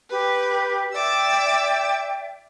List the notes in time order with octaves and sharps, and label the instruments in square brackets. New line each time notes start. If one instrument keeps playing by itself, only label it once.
[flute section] G4 [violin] B4
[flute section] D5 E5 G5 [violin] D6 E6